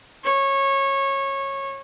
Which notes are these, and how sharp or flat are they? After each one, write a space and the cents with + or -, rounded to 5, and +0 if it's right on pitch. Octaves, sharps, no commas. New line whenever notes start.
C#5 -20